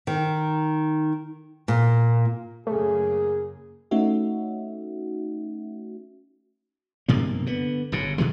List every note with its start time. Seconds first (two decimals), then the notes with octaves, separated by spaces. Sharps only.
0.07 D#3
1.68 A#2
2.67 F#2 C#3 A3 A#3 G#4
3.91 A3 C#4 D#4 F#4 E5
7.08 B1 G2 C3 A#3
7.46 D3 B3
7.92 G1 F#2 C#3
8.18 B2 D#3 F#3 G#3